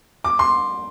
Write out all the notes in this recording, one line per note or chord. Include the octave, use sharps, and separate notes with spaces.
D6
C6